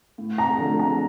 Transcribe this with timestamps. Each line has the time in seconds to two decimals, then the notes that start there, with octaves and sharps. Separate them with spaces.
0.18 A2
0.38 A#5
0.59 F3 A3 D4 F4
0.79 A#5